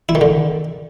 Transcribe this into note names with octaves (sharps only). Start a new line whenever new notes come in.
E4
D#3
D3